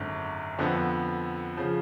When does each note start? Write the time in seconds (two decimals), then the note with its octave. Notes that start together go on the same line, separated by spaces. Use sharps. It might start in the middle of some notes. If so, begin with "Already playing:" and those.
Already playing: G#1 F#2 D3
0.59 F2 D3 F3 B3
1.57 C#3 F3